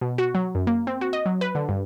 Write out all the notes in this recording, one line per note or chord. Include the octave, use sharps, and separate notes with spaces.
B2
F#4
F#3
F#2
A#3
C4
F#4
D#5
F#3
B4
D3
G2